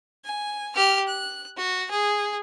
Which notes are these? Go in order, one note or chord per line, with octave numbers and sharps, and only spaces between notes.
G#5
G4 F6
F#6
F#4
G#4